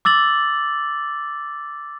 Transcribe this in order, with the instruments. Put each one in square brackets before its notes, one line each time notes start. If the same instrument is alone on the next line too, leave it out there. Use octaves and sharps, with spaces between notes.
[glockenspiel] D6 E6 A6 F#7